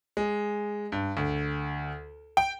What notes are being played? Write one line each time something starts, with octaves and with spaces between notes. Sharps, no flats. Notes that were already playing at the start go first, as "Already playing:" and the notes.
G#3
G2
D2
G5